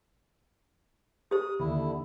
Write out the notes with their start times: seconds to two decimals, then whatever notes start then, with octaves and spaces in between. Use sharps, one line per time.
1.31 G4 C5 D#6
1.60 D#2 D3 E4